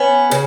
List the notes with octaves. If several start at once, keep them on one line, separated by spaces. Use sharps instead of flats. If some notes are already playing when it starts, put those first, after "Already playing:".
Already playing: B3 C#4
C#3